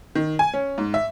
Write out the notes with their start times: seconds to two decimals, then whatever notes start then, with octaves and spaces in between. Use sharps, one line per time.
0.15 D#3
0.39 G#5
0.54 C#4
0.78 G#2
0.94 E5